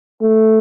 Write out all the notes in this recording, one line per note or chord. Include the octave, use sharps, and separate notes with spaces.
A3